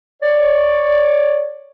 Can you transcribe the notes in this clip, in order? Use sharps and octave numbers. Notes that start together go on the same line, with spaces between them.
C#5 D5